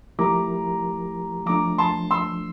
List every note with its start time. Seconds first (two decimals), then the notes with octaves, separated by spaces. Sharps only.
0.19 F3 A3 E4 G4 A#4 A#5 D6
1.46 F3 A3 D4 A#5 D6
1.78 A5 C6
2.11 C6 E6